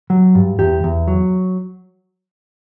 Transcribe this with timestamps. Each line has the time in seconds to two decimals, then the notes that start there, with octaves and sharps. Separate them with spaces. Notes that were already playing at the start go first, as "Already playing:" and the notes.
0.10 F#3
0.35 G2
0.59 E2 G4
0.84 E2
1.08 F#3